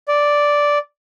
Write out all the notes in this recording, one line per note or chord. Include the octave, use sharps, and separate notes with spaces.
D5